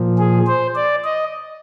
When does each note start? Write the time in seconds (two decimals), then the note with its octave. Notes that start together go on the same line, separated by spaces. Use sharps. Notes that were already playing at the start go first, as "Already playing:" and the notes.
Already playing: A#2 F3
0.18 G#4
0.47 C5
0.76 D5
1.04 D#5